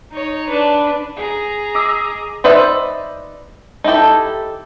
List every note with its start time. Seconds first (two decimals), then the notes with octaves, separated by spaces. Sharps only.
0.12 D#4 C#5
0.49 D4 B4
1.17 G#4 A#5
1.75 D#5 D6 E6
2.44 D#4 B4 C5 D5 E5
3.84 D#4 E4 G4 A4